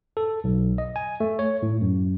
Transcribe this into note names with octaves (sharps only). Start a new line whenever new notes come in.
A4
B1
D#5
G#5
A3
C#5
A2
F#2